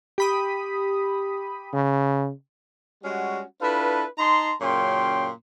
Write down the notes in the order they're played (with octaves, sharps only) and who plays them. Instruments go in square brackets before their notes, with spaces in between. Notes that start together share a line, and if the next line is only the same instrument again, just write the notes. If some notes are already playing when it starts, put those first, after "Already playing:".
[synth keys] G4 B5 D#6
[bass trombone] C#3
[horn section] G3 G#3 C#4 F#4
D4 E4 F4 A4 B4
D#4 A5 A#5 C6
F#2 A#2 C#3 C#5 G5 C6